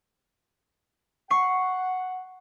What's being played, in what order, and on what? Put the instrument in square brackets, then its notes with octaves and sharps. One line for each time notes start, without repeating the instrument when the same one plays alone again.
[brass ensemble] F#5 [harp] C#6 C7